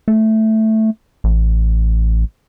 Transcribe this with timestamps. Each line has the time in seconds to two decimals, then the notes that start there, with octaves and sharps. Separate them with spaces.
0.08 A3
1.24 A1